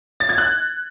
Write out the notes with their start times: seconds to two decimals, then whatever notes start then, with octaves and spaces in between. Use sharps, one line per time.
0.20 A6
0.29 G#6
0.38 F#6